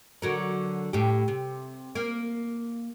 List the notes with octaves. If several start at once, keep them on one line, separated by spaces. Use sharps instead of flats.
D3 F#3 A#4
A2 G4
C3
A#3